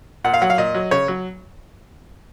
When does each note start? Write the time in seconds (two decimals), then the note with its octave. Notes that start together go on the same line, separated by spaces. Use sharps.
0.24 A#2 F#5
0.34 F5
0.42 F#3 F#5
0.50 F5
0.58 A#2 D#5
0.75 F#3
0.91 C#3 C#5
1.08 F#3